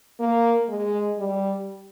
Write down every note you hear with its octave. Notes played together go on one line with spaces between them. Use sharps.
A#3
G#3
G3